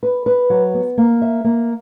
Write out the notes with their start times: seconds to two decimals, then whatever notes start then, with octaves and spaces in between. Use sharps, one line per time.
0.03 B4
0.26 B4
0.50 F#3
0.74 B3
0.98 A#3
1.22 E5
1.44 A#3